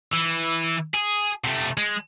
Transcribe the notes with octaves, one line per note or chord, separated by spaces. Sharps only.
E3
G#4
C3 A3
G#3